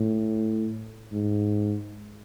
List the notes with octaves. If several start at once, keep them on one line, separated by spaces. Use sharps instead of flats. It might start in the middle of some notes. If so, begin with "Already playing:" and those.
Already playing: A2
G#2